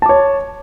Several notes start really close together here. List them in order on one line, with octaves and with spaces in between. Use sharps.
A5 D6 C#5